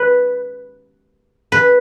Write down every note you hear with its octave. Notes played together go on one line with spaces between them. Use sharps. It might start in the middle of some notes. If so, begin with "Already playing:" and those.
Already playing: B4
B4